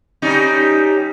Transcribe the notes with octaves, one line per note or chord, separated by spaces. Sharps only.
G3 C#4 D#4